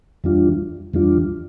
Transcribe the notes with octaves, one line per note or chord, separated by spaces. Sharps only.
F2 E3 G3 D4 F4
F2 E3 G3 D4 F4